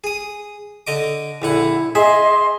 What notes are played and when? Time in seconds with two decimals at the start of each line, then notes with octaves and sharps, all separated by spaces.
0.04 G#4 D#6
0.87 D3 D#5 D6
1.42 A#1 D3 E4 F#5
1.95 G#4 D#5 E5 C6